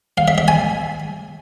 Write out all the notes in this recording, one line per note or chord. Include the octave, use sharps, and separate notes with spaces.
F5
E5
E5
G#5